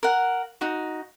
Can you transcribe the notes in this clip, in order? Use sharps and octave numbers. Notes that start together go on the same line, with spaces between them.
A#4 F#5
D#4 F#4